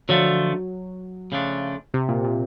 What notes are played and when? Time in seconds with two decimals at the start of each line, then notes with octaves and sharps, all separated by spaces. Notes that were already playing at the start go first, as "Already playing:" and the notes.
0.09 D3 F3 F#3 A3
1.32 C#3 F3 A3 D4
1.94 C3
2.09 A#2
2.24 A#2